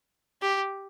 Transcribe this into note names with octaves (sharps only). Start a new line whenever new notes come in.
G4